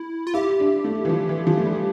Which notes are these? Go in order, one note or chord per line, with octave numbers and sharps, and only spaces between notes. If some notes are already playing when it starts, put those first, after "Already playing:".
Already playing: E4
F4
E4 G4
D4
A3
E3
F3
E3
F3
A3
G3